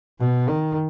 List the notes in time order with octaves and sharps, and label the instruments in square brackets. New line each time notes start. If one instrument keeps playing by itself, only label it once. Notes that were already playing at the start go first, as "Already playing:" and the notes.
[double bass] B2
D#3